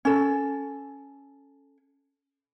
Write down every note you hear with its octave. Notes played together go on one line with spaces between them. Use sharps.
C#4 A4